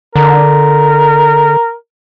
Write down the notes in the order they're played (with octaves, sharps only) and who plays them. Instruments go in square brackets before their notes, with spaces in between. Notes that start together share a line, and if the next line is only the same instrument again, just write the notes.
[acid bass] D3 [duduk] A#4